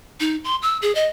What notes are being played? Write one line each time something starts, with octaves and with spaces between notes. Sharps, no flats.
D#4
C6
E6
G#4
D#5